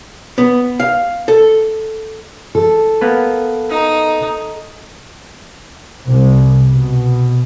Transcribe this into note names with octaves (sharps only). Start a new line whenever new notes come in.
B3
F5
A4
A4
A#3 B3 B4
D#4
C2
B2